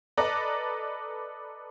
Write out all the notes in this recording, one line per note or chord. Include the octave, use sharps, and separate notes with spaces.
A4 B4 D5 D#5 A#5